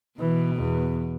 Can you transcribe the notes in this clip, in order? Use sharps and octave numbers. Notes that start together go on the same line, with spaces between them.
B2 E3
E2